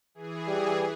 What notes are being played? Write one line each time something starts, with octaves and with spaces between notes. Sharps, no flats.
E3 G#4
G3